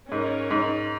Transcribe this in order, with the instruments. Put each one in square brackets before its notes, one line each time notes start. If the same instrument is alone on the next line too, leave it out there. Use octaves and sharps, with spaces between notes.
[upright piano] G#2 [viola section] C#4 A#4 C#5
[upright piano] G#2